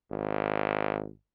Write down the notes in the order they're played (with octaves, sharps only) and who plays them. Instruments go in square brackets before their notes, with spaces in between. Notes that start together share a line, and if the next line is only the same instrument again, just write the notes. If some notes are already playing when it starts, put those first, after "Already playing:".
[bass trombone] G#1